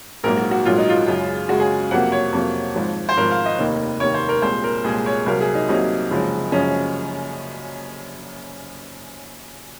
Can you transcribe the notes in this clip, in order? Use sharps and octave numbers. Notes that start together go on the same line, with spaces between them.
A#1 G#2 F#3 A#3 A#4
F#4
F#4
A#1 G#2 F#3 A#3 F4
D#4
F4
F#2 C#3 G#3
F#2 C#3 G#3 F#4
G#4
F2 C3 F#3 A#3 F#5
C#5
F2 C3 F#3 A#3
G#1 G#2 F3
C5
G#1 G#2 F3 A#4
F5
D#5
F1 D#2 D#3 A#3
F1 D#2 D#3 A#3 C#5
C5
A#4
C2 A#2 G#3 C5
A#4
C2 A#2 G#3 G#4
C#5
C2 C3 F#3 A#3 A#4
G#4
D#4
C2 C3 F#3 A#3 D#4
F#1 F#2 F3 G#3
F#1 F#2 F3 G#3 C#4